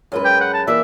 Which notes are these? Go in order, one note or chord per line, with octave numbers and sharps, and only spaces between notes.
F#2 G#3 B4
G5
F#5
A5
E3 A#3 D5 E5